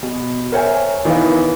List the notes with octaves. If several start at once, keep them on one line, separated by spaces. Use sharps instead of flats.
B2
A#4 C5 C#5 E5 G5 G#5
D#3 E3 B3 E4 F5